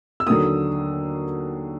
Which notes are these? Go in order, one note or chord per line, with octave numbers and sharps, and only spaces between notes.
E6
D#2 D3 F#3 D#6